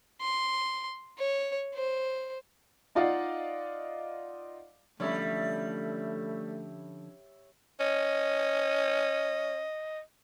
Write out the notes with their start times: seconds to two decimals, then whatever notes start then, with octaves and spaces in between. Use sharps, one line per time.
0.21 C6
1.18 C#5
1.75 C5
2.95 D#4 F4 D5 D#5 F5 F#5
5.00 D3 F3 G3 A3 C#4 C#5 E5 B5
7.80 C#4 D#5